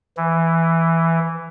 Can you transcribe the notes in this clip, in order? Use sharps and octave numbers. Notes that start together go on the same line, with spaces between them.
E3